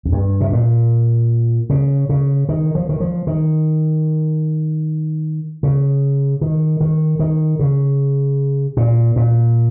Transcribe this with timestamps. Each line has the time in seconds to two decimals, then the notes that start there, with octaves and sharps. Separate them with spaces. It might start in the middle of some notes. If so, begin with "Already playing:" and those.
0.05 F2
0.12 G2
0.41 C3
0.52 A#2
1.70 C#3
2.09 C#3
2.49 D#3
2.75 F3
2.89 D#3
3.00 F3
3.27 D#3
5.63 C#3
6.41 D#3
6.80 D#3
7.19 D#3
7.59 C#3
8.77 A#2
9.16 A#2